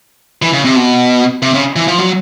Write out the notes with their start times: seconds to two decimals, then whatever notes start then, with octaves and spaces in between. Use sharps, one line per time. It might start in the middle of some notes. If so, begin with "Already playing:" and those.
0.42 E3
0.53 C#3
0.64 C3
0.76 B2
1.42 C3
1.54 C#3
1.76 E3
1.88 F3
1.98 F#3